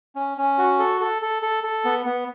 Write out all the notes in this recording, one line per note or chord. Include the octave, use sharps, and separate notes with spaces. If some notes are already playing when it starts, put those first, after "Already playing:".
C#4
C#4
F#4
A4
A4
A4
A4
A4
B3
B3